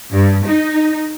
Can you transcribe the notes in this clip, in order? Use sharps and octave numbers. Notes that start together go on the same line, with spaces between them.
G2
D#4